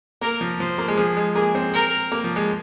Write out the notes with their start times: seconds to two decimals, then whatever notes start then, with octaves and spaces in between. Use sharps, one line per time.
0.21 A#3 A#4
0.41 F3
0.60 F3 C5
0.78 A#3
0.88 G#3
0.97 F3 G#4
1.17 G#3
1.35 A#3 G#4
1.55 C4
1.74 A#4
2.12 A#3
2.24 F3
2.36 G#3